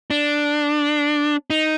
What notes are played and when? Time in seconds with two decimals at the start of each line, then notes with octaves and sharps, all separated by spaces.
0.11 D4
1.50 D#4